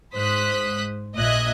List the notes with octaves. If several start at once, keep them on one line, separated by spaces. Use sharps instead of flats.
G#2 C5 D#6 F#6 B6
A#1 A#2 D#5 E5 F#6 G#6